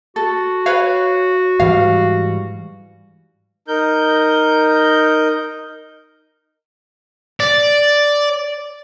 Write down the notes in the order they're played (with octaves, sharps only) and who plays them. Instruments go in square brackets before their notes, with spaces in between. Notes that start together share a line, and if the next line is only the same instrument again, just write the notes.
[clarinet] F#4 [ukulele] A4
[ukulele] B4 C#5 F5
[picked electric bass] G#2 E3 G3 [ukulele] F5
[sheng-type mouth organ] D#4 A#4 G6
[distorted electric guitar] D5